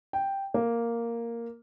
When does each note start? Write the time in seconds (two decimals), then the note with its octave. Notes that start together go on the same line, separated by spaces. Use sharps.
0.13 G5
0.54 A#3